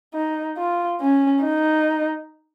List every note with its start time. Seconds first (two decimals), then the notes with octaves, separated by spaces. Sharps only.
0.14 D#4
0.58 F4
1.01 C#4
1.44 D#4